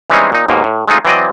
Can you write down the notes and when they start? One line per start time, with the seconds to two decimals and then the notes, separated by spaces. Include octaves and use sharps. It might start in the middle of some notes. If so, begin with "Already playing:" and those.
0.10 E3 G3 G#3 C4 C#4 D#4
0.32 A#2 D#4
0.48 D#2 G#2 B2 A#3
0.64 A2
0.88 G#3 A3 C4 D#4 F4
1.05 E3 F#3 C4 D5 D#5